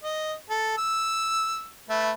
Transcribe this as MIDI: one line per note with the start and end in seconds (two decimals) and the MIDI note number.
0.04 0.33 75
0.50 0.76 69
0.78 1.67 88
1.90 2.11 57
1.90 2.11 71
1.90 2.11 76